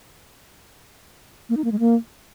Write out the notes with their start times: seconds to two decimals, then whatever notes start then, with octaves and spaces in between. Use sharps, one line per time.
1.49 A#3
1.57 D#4
1.64 A#3
1.72 G#3
1.79 A#3